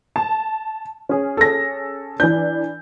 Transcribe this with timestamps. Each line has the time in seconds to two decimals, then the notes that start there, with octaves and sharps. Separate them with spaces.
0.16 A5
1.09 C#4 G#4
1.37 A4 A#6
2.20 E3 D4 G6